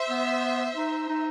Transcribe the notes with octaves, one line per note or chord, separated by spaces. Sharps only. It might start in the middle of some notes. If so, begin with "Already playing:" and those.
Already playing: C5 E5
B3
D#4
D#4